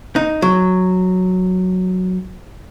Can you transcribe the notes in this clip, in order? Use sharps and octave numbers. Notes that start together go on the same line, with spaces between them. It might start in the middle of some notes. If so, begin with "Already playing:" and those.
D#4
F#3